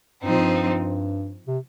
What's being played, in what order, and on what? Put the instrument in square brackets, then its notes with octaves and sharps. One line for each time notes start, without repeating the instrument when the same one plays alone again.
[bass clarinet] G2 [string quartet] F3 C4 D#4
[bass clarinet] A#2
G2
C3